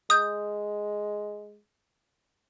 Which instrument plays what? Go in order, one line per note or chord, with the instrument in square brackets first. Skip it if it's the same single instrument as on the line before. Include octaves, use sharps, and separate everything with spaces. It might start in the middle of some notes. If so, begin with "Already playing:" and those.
[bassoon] G#3 [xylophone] D#6 G6